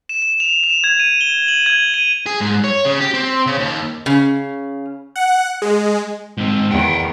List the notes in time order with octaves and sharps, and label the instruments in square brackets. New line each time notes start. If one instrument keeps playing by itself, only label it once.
[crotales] E7
E7
F7
E7
G#6
D#7
G7
F#7
G#6
D#7
[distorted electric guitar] G#4
G#2
C#5
C#3
G4
C4
C#3
D#2
[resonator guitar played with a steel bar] C#3
[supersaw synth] F#5
G#3
[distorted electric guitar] G#2 C4
[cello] E2 D#3 [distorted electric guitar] F#5 G5